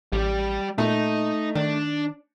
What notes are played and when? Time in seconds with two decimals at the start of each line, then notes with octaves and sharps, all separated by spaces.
0.12 A1 G3 G4
0.78 A#2 A3 D#4
1.55 D#3 D4